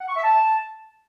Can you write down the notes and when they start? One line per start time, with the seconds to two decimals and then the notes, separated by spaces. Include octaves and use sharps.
0.01 F#5
0.08 C#6
0.16 E5
0.24 A5